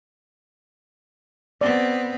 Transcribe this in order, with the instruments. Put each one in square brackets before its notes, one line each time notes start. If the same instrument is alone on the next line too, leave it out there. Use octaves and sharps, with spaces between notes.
[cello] B3 C4 [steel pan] D5